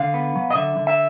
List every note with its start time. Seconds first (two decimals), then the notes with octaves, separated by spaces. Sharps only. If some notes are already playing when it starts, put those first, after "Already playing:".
Already playing: D3 F5
0.14 B3
0.36 F#3
0.51 D#5
0.55 D3 E5
0.77 D3
0.87 E5